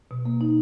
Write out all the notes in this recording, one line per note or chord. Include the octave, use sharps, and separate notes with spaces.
B2
A#3
D#4